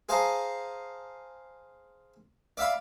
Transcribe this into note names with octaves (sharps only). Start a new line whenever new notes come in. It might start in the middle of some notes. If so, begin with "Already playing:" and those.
G#4 C5 F5 A5 A#5
D5 E5 F5 B5